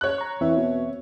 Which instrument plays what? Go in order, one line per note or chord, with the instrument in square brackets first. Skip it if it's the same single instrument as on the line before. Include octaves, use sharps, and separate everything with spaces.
[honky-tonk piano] C#5 F#6
[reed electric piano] A#5 C#6
[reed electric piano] E2 C4 E5 [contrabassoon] E3
[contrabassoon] B2